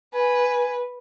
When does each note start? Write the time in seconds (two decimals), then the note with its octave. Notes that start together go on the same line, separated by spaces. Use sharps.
0.14 B4 G#5